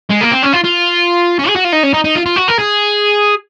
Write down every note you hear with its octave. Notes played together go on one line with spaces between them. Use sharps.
G#3
A#3
C4
C#4
F4
F4
C#4
G#4
F#4
F4
D#4
C#4
D#4
D#4
F4
F4
F#4
A#4
G#4